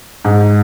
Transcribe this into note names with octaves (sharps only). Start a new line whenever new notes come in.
G#2